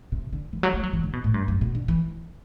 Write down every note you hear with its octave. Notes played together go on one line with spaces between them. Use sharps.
C3
D3
E3
F#3
A3
F#3
E3
D3
B2
A2
G2
F#2
B2
D3
E3